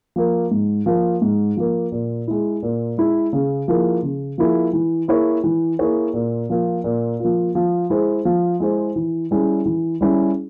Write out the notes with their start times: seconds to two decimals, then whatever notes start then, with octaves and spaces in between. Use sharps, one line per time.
0.16 F3 A#3
0.51 G#2
0.86 F3 A#3
1.21 G#2
1.57 F3 A#3
1.92 A#2
2.28 G#3 E4
2.63 A#2
2.98 G#3 E4
3.33 C#3
3.68 F3 A#3 E4 G#4
4.03 C#3
4.38 F3 A#3 E4 G#4
4.73 E3
5.08 A#3 E4 G#4 C#5
5.44 E3
5.79 A#3 E4 G#4 C#5
6.14 A#2
6.50 F3 A#3 F4
6.84 A#2
7.20 F3 A#3 F4
7.55 F3
7.90 G#3 E4 G#4 C5
8.25 F3
8.60 G#3 E4 G#4 C5
8.96 E3
9.31 G3 C#4 E4 G#4
9.66 E3
10.01 G3 C#4 E4 G#4